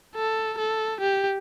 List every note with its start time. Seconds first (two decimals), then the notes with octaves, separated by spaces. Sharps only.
0.15 A4
0.58 A4
1.00 G4